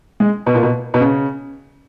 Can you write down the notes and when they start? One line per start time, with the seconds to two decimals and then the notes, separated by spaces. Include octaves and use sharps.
0.20 G#3
0.46 B2
0.55 A#2
0.63 B2
0.94 B2
1.00 C#3